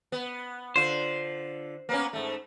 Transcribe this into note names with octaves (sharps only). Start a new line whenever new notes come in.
B3
D3 F4 C5
A#3 B3 C#4
G#2 A3